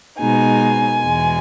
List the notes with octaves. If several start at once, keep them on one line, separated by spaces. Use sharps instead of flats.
B2 G#3 D#4 G#5
E2 B2 G#3